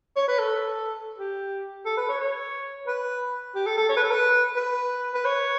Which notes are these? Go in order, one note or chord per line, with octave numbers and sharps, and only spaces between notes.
C#5
B4
A4
G4
A4
B4
C#5
C#5
B4
G4
A4
A4
C#5
B4
A4
B4
B4
B4
C#5